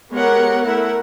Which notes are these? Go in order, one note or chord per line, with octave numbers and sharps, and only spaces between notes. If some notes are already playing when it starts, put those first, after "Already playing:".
G#3 B3 G4 A#4 C#5 F#5
A3 E4 A#4 F#5